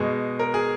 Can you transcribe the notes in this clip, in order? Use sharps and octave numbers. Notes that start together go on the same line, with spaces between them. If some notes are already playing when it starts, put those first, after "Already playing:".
Already playing: B2 G#3 G#4
A#4
G#4